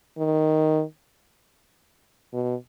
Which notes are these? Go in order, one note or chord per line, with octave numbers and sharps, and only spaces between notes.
D#3
B2